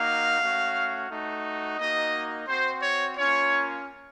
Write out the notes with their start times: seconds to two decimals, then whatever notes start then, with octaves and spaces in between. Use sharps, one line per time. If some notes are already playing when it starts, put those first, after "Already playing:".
Already playing: A#3 D#4 F#4 F5
0.40 A3 C#4 F#4
1.09 A3 D#4 F#4
1.78 A#3 D#4 F#4 D#5
2.48 C4 F#4 C5
2.82 C#5
3.17 A#3 C#4 F4 C#5